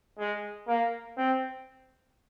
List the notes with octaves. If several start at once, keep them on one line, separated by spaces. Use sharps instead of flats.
G#3
A#3
C4